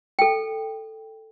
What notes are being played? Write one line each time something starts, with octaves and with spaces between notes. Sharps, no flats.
A4 G5